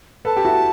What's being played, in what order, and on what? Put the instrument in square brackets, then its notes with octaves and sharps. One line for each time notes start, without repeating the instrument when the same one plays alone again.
[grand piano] A4 B4 [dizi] A5
[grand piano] G4
E4 F#4